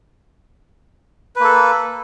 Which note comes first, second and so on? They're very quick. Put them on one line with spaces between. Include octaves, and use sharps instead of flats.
B4 A#3 A4